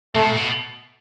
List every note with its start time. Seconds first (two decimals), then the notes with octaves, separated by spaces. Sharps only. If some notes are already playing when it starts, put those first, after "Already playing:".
0.15 C3 A3
0.22 B2
0.30 A#2
0.37 B2